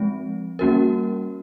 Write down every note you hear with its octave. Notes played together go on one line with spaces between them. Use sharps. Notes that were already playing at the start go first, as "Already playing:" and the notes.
Already playing: F3 G#3 C4
G3 A#3 C#4 F#4 A#4